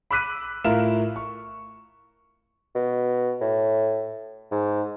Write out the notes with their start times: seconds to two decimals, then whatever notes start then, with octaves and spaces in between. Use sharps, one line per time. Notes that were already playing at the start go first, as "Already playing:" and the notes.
0.11 B5 D6 E6 F#6 B6 D#7
0.64 A2 E4 F4 A#4 E7
1.16 C#6
2.75 B2
3.41 A2
4.52 G#2